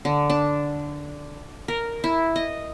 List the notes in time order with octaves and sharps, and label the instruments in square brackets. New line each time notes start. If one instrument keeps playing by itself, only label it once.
[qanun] D3
D4
A#4
E4
D#5